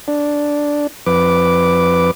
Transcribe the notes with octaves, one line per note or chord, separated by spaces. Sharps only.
D4
F2 B4 D6